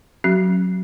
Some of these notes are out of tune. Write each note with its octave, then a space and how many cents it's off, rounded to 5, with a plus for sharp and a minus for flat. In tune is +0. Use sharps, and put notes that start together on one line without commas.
F#3 -5 C#4 -40 F#4 +30